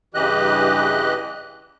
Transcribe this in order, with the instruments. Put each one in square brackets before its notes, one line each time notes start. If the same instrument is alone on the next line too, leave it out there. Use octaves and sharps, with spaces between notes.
[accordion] G2 C#3 E3 G4 D#5 F#6